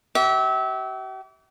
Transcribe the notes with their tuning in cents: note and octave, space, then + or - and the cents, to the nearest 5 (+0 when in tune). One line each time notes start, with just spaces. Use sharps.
G4 -45 E5 -25